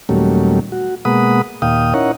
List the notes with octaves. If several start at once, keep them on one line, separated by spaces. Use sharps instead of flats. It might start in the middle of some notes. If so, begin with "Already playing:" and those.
D#2 A#2 F#3 G3 A3 C#4
F#4
B2 G#3 A#3 F#5 B5 D#6
D#2 A#2 F5 G5 D#6
C#4 D#4 E4 A#4 C#5 F#5